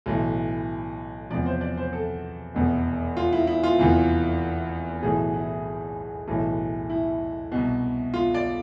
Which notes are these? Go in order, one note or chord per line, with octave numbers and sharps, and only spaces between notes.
B1 A2 E3
E2 C3 F3 D5
C5
D5
C5
A4
F1 E2 B2
F4
E4
E4
F4
F1 E2 C3 E3
B1 A2 E3 G#4
E4
B1 A2 E3
E4
C2 B2
F4
D5